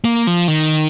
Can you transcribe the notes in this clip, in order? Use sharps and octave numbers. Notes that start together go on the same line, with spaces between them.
A#3
F3
D#3